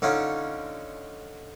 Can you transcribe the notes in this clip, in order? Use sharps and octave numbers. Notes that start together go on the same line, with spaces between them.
D3 C#4 D#4 F4